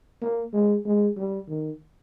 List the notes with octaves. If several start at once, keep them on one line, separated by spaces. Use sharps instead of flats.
A#3
G#3
G#3
G3
D#3